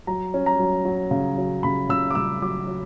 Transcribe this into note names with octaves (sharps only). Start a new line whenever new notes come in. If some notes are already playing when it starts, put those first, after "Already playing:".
F#3 A#5
C#4
A#5
F#3
F#3
C#3
F#3
C#3 B5
C#3 E6
D6
C#3 E6
F#3 D6
F#3